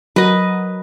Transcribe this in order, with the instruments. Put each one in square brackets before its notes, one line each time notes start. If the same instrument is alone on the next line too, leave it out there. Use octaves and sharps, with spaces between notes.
[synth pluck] F#3 F#4 A#4 [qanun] B4 D#5